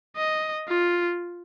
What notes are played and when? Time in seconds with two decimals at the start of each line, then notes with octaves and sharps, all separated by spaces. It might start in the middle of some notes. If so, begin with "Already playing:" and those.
0.17 D#5
0.68 F4